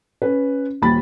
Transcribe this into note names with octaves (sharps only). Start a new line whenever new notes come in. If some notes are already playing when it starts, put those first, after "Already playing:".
C#4 B4
D#1 D#2 B5 A6